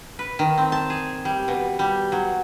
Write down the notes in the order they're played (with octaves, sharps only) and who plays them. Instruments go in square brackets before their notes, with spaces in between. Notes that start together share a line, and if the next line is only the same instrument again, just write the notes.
[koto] B4
D#3
C4
A5
G#4
G3
B2
G3
F#3